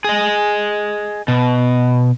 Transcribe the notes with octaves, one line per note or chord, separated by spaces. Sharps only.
G#4 D#5
B2